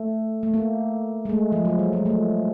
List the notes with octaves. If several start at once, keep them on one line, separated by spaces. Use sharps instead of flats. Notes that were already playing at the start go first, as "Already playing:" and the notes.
Already playing: A3
A3
A#3
G#3
A3
F3
F#3
G3
G#3
A3